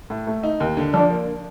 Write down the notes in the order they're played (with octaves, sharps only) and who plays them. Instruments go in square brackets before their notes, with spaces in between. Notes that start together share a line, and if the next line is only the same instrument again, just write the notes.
[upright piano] A2
A3
D#4
D#2
D3
[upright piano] F3 [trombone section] D4
[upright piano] A#3